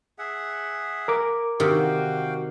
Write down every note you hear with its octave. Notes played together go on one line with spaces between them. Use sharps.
G#4 E5 F#5
A#4 D6
C3 D#3 F#4 F5 G5